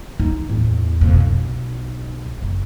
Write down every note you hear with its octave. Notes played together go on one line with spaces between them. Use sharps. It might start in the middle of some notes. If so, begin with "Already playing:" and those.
D#4
E2 A2
F2 B2
B1
F#1